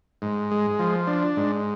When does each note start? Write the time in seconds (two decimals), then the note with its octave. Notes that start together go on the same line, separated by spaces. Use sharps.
0.22 G#2
0.51 G#3
0.79 F3
1.07 D4
1.37 G#2